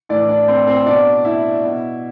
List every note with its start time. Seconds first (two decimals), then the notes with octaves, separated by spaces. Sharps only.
0.09 A2 E3 D4 D5
0.29 D4 D5
0.48 C4 C5
0.67 C4 C5
0.86 B2 D4 D5
1.25 E4 E5
1.64 B2